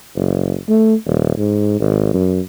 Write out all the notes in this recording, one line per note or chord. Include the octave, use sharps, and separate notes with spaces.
F#1
A3
D#1
G#2
G#1
F#2